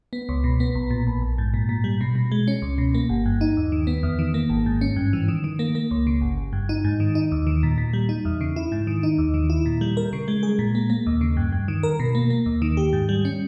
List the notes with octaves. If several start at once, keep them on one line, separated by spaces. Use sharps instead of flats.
B3
C#2
B2
B3
B1
A#2
A#1
A#1
G#2
A#2
A#2
G3
B2
B2
G#3
C#4
C#2
B2
A#3
G1
G2
D#4
D#2
D#3
B3
E2
D#3
A#3
G#1
G#2
C#4
G2
E3
D#3
D#3
A#3
A#3
C#2
C#3
G1
G1
G2
D#4
G#2
D#3
D#4
D#2
D#3
A#2
A#2
G3
D#4
E2
C#3
E4
G#2
D#3
D#4
D#2
D#3
E4
A#2
G3
A#4
C#3
G#3
G#4
A#2
A#3
A#3
D#2
C#3
G2
G2
D#3
A#4
B2
A#3
A#3
D#2
D#3
G4
G#2
G3
C#4